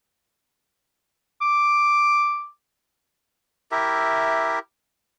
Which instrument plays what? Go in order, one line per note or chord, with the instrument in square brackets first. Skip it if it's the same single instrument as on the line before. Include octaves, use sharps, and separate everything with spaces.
[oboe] D6
[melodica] E4 G4 A#4 E5